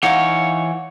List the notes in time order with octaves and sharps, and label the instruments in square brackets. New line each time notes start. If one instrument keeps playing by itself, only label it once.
[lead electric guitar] E3 C#5 [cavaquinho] D#4 F5 [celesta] F#5